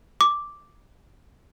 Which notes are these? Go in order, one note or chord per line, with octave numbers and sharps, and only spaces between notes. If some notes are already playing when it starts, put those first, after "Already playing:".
D6